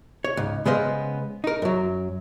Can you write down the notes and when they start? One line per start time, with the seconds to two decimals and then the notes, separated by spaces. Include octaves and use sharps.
0.24 C#5
0.37 C#2 G#2
0.65 C#3 G#3 B3 C5 D#5 F5
1.44 D#4 A#4
1.62 F#2 F#3